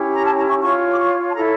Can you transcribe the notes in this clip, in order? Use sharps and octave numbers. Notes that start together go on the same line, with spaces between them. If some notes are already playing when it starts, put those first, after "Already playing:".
Already playing: C#4 E4 G4
A#5
A5
A#5
C#6
F4 C#5 C#6
D6
C#6
A5
E4 A4 C#5 A#5